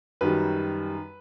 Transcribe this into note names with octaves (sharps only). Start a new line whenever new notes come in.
F#2 D#3 G3 B4